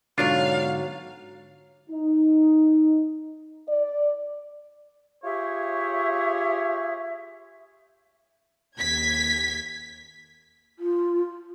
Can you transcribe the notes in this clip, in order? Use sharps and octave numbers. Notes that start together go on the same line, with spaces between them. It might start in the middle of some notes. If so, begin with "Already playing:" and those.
G#2 B2 D3 F#3 D4 F4 C#5 F5
D#4
D5
F4 G4 G#4 C#5 E5
D#2 G#6 B6
F4